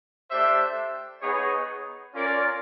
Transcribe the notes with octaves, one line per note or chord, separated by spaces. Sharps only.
A3 D4 G4 C5 E5
B3 D#4 G#4 C#5
C#4 F4 A#4 D5